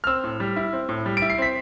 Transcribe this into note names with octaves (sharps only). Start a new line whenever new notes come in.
F6
C4 E6
A2
G3
E4
C4
A2
G3
D7
E4
C7
C4 B6